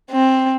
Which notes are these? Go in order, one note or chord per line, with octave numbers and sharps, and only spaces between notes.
C4